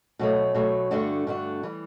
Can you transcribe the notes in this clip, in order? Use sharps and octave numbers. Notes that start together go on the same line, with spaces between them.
B2 F#3 A3
B2 F#3 A3
G2 D3 A3 D4 F#4
G2 D3 A3 D4 F#4
E3 G3